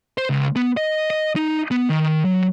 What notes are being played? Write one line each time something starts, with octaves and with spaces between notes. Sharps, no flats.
C5
C#2
B3
D#5
D#5
D#4
B3
D#3
F#3